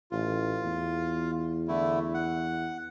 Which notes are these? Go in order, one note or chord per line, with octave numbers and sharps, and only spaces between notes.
A1 F4
E2
D3 A3 E4
F#5